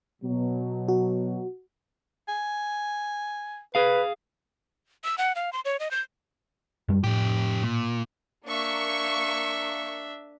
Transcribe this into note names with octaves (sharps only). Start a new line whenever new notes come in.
B2 F#3
F#4
G#5
G#4 B4 F5
E6
F#5
F5
C6
C#5
D#5
G6
F#2 G3
F2 A2 G4
A#2
A#3 D4 E5 C#6